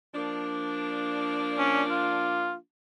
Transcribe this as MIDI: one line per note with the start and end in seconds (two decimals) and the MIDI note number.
0.14 2.58 53
0.14 2.58 58
0.14 2.58 62
1.58 1.83 61
1.90 2.55 65